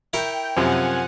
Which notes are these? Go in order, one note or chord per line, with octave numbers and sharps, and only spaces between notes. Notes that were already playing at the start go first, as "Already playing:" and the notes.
E4 A#4 G5 C#6
F#2 C3 F3 F#5 G#5